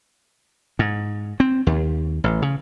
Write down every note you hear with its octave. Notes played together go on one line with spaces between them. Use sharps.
G#2
C4
D#2
A1
C#3